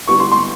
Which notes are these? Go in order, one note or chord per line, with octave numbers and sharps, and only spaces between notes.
D3 G3 B3 E4 C#6
C6
C6